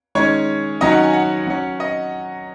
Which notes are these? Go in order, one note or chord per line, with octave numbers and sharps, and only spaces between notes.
D#3 G#3 C#4 C#5
D#3 F#3 C#4 D#5
F#5
G#5
F#5
F#3 C#4
D#5